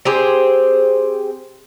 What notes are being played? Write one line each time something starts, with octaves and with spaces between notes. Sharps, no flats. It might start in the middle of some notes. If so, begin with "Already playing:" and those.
C4 G4 G#4 C5